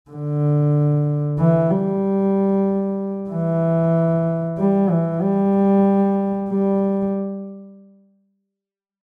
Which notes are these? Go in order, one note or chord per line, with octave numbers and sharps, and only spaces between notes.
D3
E3
G3
E3
G3
E3
G3
G3